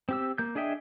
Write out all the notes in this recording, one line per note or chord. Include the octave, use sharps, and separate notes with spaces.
C4 G4 E6
A#3 G6
D4 G#4 D#5 E5 G5